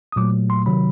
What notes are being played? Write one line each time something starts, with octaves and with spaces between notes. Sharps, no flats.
D#6
A#2 F#3 A3 D6
C6
C3 D#3 F#3 B5